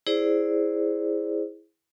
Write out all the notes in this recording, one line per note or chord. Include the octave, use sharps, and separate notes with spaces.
E4 G#4 C5 D5